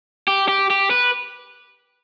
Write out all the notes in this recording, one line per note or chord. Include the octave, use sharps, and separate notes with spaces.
G4
G4
G4
B4